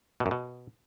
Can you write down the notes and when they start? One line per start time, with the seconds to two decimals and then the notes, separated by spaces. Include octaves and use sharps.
0.20 B2
0.26 F#2
0.31 B2